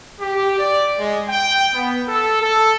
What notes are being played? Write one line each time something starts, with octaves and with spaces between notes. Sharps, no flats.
G4
D5
G#3
G5
B3
A4
A4